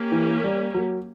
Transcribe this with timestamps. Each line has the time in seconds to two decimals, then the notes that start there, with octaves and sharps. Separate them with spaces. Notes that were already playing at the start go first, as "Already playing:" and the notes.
Already playing: A#3 C#4 G4
0.12 E3
0.44 G3
0.74 F#3